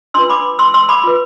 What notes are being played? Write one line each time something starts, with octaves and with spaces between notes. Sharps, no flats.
D4 F4 B4 C6 E6
B5 D6
C6 E6
C6 E6
B5 D6
F4 B4